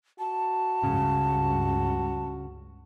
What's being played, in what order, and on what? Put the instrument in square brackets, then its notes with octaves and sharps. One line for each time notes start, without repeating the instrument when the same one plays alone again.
[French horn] F#4 [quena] A5
[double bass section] C#2 G2 [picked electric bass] C#3